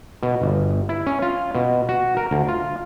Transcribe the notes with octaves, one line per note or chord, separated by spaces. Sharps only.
B2
G1
E4
C#4
F4
B2
F#4
A#4
D2
F4